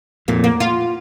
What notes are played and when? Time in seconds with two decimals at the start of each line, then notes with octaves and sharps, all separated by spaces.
0.28 F2 A#2 A#3
0.44 A#3
0.60 F4